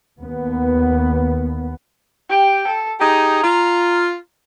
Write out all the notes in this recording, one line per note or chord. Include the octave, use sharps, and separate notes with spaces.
D#2 B3
G4 G5
A4
D#4 G4 G#4 A#5
F4